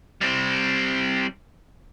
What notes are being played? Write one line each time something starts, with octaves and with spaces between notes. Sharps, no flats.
G3 C4